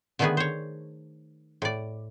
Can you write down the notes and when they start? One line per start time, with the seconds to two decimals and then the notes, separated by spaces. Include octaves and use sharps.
0.19 D3 D#3 A3 B3 G#4 B4
0.37 C5 C#5
1.62 A2 D5